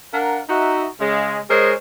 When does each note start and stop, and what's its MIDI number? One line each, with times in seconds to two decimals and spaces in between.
0.13 0.39 62
0.13 0.39 70
0.13 0.39 77
0.13 0.39 78
0.13 0.39 82
0.49 0.86 63
0.49 0.86 66
0.49 0.86 76
1.00 1.40 49
1.00 1.40 56
1.50 1.73 56
1.50 1.73 68
1.50 1.73 70
1.50 1.73 72
1.50 1.73 73
1.50 1.73 75